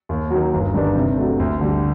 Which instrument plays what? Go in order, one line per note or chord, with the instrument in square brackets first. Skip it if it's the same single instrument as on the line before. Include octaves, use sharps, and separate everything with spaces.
[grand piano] D#2
D#3 F#3
G1
G2 D#3 G3 D4
C3
F#3 A3
D2
D3 G3